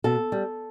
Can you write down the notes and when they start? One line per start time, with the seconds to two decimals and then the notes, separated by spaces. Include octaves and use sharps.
0.04 B2 A4
0.32 G3